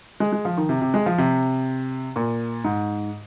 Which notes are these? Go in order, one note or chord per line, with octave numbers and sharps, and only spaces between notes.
G#3
G#3
F3
D#3
C3
C3
G#3
F3
C3
A#2
G#2